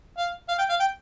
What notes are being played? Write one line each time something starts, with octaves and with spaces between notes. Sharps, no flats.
F5
F5
G5
F5
G5